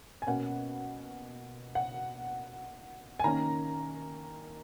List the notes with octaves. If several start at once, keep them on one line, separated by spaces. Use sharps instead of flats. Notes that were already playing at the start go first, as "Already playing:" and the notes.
G#5
B2 A#3 C#4 F#5
F#5
G#5
D#3 A#3 C#4 A#5